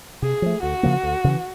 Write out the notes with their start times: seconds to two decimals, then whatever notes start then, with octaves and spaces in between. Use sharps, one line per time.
0.22 C3 G#4
0.42 F3 A3
0.62 D2 F#4
0.83 C#3 F3 A#3
1.03 D2
1.24 C#3 E3